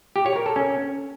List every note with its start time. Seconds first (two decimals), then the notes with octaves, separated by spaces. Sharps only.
0.16 G4
0.26 C#5
0.36 A#4
0.46 A4
0.56 C#4